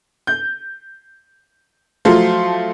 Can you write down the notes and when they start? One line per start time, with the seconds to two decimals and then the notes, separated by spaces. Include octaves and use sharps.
0.27 G6
2.05 F3 F#3 A3 F4